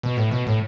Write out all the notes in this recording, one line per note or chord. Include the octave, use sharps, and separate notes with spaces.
B2
A2
B2
A2